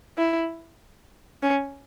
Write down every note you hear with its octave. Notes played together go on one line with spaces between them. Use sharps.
E4
C#4